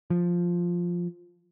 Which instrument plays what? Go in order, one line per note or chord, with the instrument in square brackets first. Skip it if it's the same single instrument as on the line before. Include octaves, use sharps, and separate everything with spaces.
[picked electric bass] F3